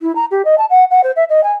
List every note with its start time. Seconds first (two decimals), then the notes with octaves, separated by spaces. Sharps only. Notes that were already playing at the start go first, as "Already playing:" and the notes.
0.01 E4
0.16 A#5
0.31 G4
0.45 D#5
0.58 A5
0.70 F#5
0.91 F#5
1.04 C5
1.16 E5
1.30 D#5
1.44 G#5